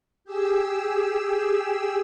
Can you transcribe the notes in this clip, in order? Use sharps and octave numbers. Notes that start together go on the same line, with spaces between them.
G4 G#4 E6